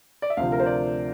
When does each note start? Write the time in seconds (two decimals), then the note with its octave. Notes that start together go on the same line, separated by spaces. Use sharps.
0.22 D5
0.30 E5
0.37 D2 C3 F3 F5
0.52 A#4
0.60 C5
0.66 D5